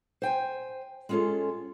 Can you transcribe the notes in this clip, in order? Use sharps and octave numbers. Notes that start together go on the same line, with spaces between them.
C5 G5 G#5
G#3 C#4 F4 G#4 A4